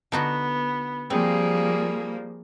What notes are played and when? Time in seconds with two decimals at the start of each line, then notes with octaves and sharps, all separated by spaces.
0.12 D3 B3 D#4 F#4
1.10 F3 G3 A#3 C4 G#4